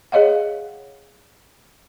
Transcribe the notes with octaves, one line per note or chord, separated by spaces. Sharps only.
G#4 C#5 D#5 F5 F#5